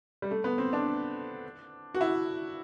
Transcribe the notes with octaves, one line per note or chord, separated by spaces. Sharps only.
G3
A3
B3
C4
D4
F#4
E4